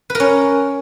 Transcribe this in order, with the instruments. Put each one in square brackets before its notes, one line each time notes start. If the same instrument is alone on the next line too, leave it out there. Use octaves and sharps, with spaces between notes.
[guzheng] B4
A#4
C#4